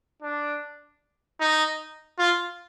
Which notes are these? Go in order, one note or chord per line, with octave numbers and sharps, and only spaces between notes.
D4
D#4
F4